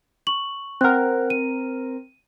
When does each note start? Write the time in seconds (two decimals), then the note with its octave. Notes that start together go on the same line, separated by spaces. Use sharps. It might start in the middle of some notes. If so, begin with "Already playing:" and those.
0.27 C#6 F#7
0.81 C4 A#4 F#5 F#6
1.30 D#7